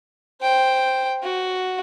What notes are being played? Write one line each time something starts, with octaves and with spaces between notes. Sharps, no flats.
C5 G5
F#4